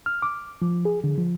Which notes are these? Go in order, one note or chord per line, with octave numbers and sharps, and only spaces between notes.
F6
D6
F3
G#4
D3
F3